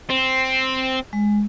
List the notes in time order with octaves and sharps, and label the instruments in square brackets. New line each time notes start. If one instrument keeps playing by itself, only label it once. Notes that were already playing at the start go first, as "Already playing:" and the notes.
[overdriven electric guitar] C4
[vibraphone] G#3